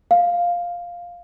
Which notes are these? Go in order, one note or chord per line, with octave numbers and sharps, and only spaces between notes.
F5